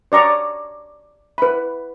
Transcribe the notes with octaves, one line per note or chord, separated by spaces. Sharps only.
C#5 D5 A#5 C#6 D#6
B4 B5